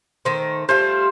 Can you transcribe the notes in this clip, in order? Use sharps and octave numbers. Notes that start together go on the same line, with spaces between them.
D#3 A3 C5
G3 A3 F4 C5